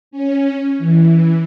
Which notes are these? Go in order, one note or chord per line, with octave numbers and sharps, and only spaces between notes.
C#4
E3